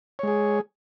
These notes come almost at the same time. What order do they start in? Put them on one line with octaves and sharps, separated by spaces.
C#5 G#3 G#4